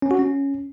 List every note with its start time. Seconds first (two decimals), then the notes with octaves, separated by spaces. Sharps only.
0.02 C#4
0.11 F#4
0.19 C#4